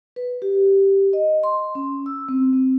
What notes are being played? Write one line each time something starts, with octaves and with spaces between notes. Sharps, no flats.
B4
G4
D#5
C6
C#4
E6
C4
C4